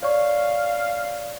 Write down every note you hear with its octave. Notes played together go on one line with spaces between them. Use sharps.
C#5 D5 F5 C#6